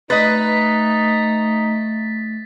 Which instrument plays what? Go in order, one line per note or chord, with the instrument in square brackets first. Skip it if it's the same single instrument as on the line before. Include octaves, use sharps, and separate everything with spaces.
[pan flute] A3 [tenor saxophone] D#4 [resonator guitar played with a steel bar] B4 D#5 [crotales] A6 B6